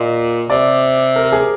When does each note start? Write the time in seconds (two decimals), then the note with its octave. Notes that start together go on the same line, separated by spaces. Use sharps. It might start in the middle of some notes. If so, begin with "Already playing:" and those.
Already playing: A#2 D#5
0.49 C3 D5
1.16 A#4
1.32 G#4